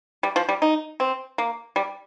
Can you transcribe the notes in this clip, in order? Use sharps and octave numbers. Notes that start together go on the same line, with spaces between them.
G3
F3
G3
D#4
C4
A#3
G3